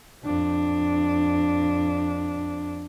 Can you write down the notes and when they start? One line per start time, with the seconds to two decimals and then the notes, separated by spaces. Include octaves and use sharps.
0.24 F2 D4